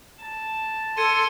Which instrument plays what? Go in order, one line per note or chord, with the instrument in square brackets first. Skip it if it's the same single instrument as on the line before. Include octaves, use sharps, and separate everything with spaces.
[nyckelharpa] A5
[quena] A4 [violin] C6 [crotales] G#6 C#7 D#7